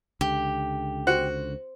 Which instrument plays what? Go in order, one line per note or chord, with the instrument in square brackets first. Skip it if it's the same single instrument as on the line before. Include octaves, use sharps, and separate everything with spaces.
[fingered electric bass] C#2 D3 [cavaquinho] G4
[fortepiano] F#4 [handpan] C5